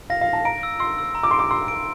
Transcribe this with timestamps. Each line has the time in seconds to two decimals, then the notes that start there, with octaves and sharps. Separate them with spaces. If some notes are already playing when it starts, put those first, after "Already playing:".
0.10 F5 A#6
0.21 F5
0.28 A#6
0.33 A5
0.45 A#5 D7
0.63 E6
0.80 C6 E6
0.98 E6
1.15 A#5
1.23 D6
1.31 C6 D7
1.39 D6
1.51 C6 E6
1.68 D7